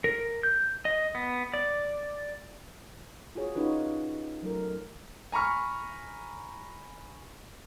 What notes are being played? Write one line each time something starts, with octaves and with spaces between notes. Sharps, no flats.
A#4
G6
D#5
B3
D5
F4 F#4 G#4 C#5
C#4 D#4 F4 F#4 B4
F#3 A3 A#4
G#5 A#5 B5 C#6 F6